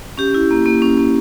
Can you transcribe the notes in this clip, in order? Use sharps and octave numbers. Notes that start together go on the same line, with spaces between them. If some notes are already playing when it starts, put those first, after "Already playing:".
C#4 G4
E4
A#3
A#3
C#4
A#3